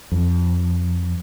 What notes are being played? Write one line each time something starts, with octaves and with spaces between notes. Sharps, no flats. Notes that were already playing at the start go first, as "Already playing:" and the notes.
F2